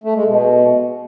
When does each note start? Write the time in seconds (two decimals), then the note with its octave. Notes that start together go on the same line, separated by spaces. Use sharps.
0.04 A3
0.15 G#3
0.25 B2